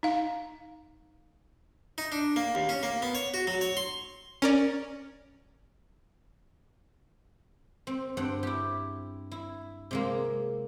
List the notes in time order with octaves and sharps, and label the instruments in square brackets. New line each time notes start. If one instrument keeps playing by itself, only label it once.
[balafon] D#4 F5
[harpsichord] D#4
D4
A#3
D#2
C#4
A#3
B3
C#5
F#4
F#3
C#5
C6
[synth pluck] C#4 A#4 D5
[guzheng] C4
G2 C4 F#5 G5
E4 G4
E4
C3 G#3 A#3